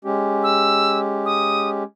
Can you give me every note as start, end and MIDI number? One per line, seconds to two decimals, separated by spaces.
0.05 1.83 56
0.05 1.83 61
0.05 1.83 67
0.43 0.99 88
1.25 1.69 87